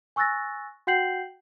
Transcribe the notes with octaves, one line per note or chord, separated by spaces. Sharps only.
G#5 C#6 E6 F#6 A6 A#6
F#4 F#5 G5 G6 C7 F#7